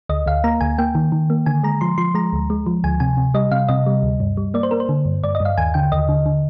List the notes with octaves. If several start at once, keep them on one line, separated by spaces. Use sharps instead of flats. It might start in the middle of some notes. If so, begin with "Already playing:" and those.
D2 D#5
D2 F5
A#3 A#5
D2 G#5
A#3 G5
D#3
D#3
A#3
D3 G#5
G#3 A#5
F3 C6
F3 C6
G#3 A#5
D2
G#3
F3
D2 G#5
C3 G#5
C3
G3 D#5
C3 F5
C3 D#5
G3
D2
G2
G3
A#3 D5
C5
A#3 A#4
C5
D3
G2
G2 D5
D#5
G2
F5
D#2 G#5
D3 G5
D#2 D#5
D3
D3